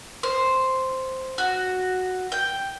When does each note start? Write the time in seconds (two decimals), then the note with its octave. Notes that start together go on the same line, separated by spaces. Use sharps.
0.23 C5
1.38 F#4
2.32 G5